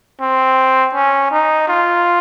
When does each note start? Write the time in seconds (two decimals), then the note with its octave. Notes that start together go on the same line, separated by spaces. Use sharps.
0.21 C4
0.94 C#4
1.31 D#4
1.68 F4